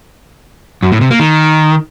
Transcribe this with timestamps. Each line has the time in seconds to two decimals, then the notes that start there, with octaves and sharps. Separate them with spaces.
0.83 F#2
0.92 A2
1.01 C3
1.10 A#3
1.20 D#3